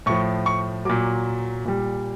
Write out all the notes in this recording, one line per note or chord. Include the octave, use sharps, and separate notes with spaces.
A2 F3 C#6
C#6
A#2 F#3 D6
A#2 G3